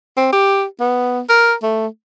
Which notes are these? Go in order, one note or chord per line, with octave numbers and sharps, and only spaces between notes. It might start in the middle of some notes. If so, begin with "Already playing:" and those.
C4
G4
B3
A#4
A3